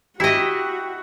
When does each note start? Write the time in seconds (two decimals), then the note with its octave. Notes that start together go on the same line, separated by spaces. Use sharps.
0.20 E4 F#4 G4 D#5 B6